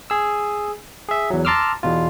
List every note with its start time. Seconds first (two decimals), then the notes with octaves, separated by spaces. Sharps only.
0.10 G#4 E6
1.09 G#4 E5
1.30 E2 F#3
1.45 A5 A#5 C6 D6 E6 F6
1.83 E2 B2 F4